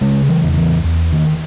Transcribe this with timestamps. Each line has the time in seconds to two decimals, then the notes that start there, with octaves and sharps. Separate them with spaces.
0.01 C#3 G#3
0.29 E3
0.43 E2
0.52 D#3
0.57 E3
0.84 E2
1.13 D#3